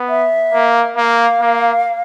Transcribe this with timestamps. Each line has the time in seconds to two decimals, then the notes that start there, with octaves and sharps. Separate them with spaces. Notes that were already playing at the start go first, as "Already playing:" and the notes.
Already playing: B3
0.09 E5
0.53 A#3
0.97 A#3 F5
1.41 A#3